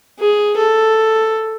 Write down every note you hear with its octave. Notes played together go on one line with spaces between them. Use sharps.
G#4
A4